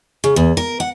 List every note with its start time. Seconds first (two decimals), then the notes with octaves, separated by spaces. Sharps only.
0.24 C#3
0.36 E2
0.57 A#4
0.80 F#5